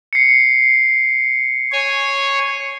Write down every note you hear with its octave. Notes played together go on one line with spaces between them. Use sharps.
C7 C#7
C#5 G#5